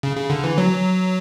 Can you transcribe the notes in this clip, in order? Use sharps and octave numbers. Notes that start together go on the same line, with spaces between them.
C#3
C#3
D3
E3
F#3